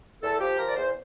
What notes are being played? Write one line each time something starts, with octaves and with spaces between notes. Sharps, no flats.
E2 A4
F3 G4
F3 A#4
D5
E2 C5